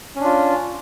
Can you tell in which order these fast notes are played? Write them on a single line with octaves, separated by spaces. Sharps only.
C#4 D4 F4